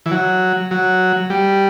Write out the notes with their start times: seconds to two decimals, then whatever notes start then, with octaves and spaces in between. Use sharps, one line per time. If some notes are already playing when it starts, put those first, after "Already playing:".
0.06 E3
0.11 F#3
0.71 F#3
1.30 G3